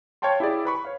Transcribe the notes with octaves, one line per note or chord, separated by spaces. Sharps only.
C#5 F5 G5 A5 C6
E4 G4 G#4 D5
B4 B5 C#6
C#5 F5